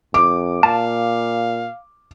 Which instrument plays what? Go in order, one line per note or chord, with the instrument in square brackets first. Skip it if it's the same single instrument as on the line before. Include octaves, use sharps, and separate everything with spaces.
[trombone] F2 [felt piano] D6
[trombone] A#2 [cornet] F5 [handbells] A5